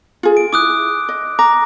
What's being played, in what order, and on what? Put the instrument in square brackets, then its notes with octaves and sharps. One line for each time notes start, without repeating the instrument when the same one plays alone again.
[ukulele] F4 G#4
[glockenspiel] D7
[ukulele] E4 [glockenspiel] D6 D#6 F#6
[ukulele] D#5
[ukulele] A#5 [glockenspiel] D6 A#6